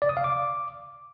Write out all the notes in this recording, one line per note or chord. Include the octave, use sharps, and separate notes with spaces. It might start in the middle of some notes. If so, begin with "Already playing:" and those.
D5
D#6
F5
D6